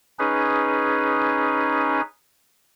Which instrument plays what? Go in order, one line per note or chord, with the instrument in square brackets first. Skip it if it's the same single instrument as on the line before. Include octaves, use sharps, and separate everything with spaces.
[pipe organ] C#4 D#4 G#4 B4